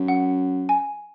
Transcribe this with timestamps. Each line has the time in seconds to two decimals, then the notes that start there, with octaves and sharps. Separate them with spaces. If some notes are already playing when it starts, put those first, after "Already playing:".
Already playing: F#2
0.08 F#5
0.69 G#5